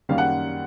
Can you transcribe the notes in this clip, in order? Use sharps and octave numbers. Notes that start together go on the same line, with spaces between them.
F#2 D#3 G3 A#3 C#4 F5
F#5